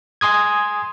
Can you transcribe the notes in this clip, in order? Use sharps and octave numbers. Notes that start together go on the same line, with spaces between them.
G#5 C6 D#6 G#6